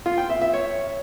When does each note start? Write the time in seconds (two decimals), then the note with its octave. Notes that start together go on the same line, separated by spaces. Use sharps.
0.06 F4
0.18 G5
0.30 E5
0.42 E5
0.54 C#5